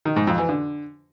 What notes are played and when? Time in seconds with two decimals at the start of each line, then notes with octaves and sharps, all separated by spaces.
0.05 D#3
0.16 G#2
0.27 F2
0.38 E3
0.49 D3